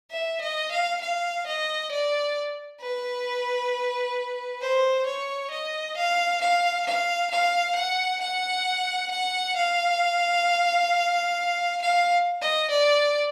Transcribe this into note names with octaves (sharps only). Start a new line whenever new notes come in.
E5
D#5
F5
F5
D#5
D5
B4
C5
C#5
D#5
F5
F5
F5
F5
F#5
F#5
F#5
F5
F5
D#5
D5